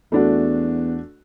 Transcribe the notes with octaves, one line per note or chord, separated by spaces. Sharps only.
E2 A3 D4 F#4